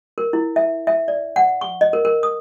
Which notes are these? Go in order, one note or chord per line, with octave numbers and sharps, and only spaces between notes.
A#4
E4
E5
E5
D5
F#5
C#6
D#5
A#4
A#4
D#6